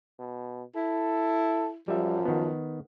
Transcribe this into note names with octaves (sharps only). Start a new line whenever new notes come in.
B2
E4 A4
F#2 F3 G3 E5
D#3 B3